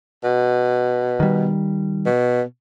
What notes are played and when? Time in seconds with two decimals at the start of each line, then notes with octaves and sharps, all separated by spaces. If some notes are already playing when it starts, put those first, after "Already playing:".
0.23 B2
1.20 D#3 G3
2.06 B2